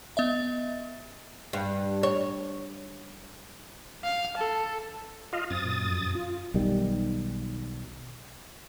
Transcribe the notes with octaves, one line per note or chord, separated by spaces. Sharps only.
B3 D#5 E5
G2
C#5
F5
A4
F4 D#5 F5
F#2 C4 D#6 A6
A#2
F2
F4
B1 D#3 G3